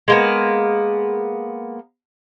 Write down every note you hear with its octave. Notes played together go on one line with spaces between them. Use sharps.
G#3 A#3 B3